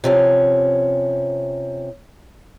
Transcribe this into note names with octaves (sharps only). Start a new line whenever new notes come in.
C3 F3 C#4